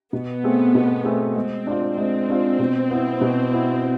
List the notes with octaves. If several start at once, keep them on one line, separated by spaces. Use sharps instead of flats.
B2 B3
A3 C4 G#4
B2
A3 C4 G#4
G#3 C4
D4 F4
G#3 C4
D4 F4
B2
B3 E4
B2
B3 E4